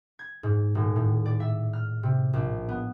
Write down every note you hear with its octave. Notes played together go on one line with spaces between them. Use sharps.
G#6
G#2
D#1
A2
D5
E5
F6
C3
A#1
B3